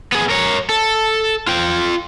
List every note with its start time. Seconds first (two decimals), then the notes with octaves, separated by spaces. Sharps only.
0.12 B3 G#4
0.30 A#4 C#5
0.69 A4
1.47 F4 G5